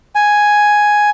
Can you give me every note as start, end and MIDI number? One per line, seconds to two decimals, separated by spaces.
0.15 1.10 80